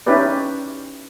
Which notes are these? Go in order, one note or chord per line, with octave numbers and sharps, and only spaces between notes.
C#4 D#4 E4 G4 B4 D5